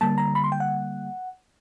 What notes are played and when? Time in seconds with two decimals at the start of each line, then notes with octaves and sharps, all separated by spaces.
0.01 D3 G3 A#3 A5
0.18 A#5
0.35 B5
0.44 C6
0.52 G5
0.60 F#5